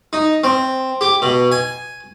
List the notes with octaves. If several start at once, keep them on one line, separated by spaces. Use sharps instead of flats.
D#4
C4
G4
B2
G#5